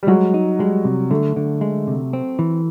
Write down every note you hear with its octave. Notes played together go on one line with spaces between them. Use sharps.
G3
F#3 G#3
D#4
G3 G#3
C3
D3 A3
D3
G#3
C3
C4
E3